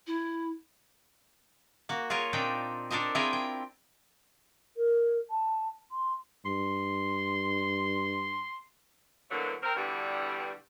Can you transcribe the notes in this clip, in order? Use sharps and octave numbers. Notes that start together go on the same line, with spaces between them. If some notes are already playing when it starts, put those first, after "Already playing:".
E4
A#3 F#4
F4 G#4 A#4 C#5
A#2 C4 D4 D#4 G5
D4 A4 A#4 C5 D#5
C4 E4 F4 G#4 A#4 G5
G5
A#4
A5
C6
G2 C6
B2 D3 E3 F#3 A3 A#3
C4 A#4
G2 B2 D3 E3 G3